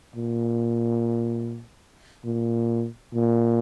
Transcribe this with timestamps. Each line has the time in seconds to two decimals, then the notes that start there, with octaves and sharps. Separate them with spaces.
0.16 A#2
2.25 A#2
3.13 A#2